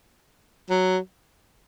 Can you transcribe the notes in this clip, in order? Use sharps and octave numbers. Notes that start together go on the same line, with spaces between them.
F#3